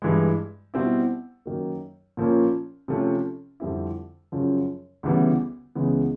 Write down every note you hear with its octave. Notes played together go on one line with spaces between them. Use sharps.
G2 E3 G#3
B2 G3 C4 E4
F#2 D#3 F#3 A#3
A#2 F3 A#3 C#4
C3 F3 A3 C#4
F2 D3 G3 C4 E4
F#2 C#3 F3
D2 C#3 E3 G3 B3
C#2 C#3 E3 G#3 B3